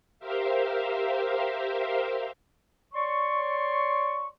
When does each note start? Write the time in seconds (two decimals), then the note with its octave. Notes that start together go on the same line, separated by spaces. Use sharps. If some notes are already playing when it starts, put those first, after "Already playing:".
0.19 G4 A#4 C5 E5 F5
2.94 C#5 D5 C6 C#6